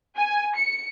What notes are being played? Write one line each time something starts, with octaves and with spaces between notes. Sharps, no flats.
G#5
C#7